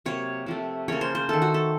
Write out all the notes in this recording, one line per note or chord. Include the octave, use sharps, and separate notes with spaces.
C3 F#3 A#3 C#5
C3 F3 A3
C#3 F3 A#3 C#5
C5
C5
D#3 A3 A4
F#4
A4